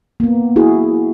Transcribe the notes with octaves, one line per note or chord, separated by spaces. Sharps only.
A#3 B3
E4 F#4 G#4